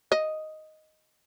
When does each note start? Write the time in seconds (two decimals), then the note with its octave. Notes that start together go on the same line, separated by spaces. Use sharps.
0.12 D#5